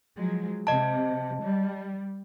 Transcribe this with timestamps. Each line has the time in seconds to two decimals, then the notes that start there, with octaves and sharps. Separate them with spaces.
0.17 F3 F#3 G#3
0.67 C3 D#5 A5
1.42 G3